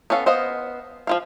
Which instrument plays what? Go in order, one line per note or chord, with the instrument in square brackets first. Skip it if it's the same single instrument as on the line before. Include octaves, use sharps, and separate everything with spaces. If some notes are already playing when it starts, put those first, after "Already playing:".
[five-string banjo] B3 C#4 A4 F5
B3 C5 D#5 F5
F3 F4 F5